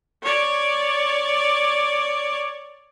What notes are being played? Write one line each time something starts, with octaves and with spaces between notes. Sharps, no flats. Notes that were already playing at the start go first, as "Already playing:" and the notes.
C#5 D5